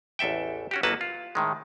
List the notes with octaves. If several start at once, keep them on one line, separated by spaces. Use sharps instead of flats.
A1 E2 A4 E5 G5
C#4 F#4 G4
A1 F#3 A#3 F#4 B4 A5
F4
A2 D#3 G#3